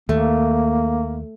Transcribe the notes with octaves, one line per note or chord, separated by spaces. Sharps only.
D#2 A3 A#3